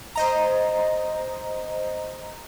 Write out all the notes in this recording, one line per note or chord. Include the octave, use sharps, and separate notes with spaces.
C5 D#5 A#5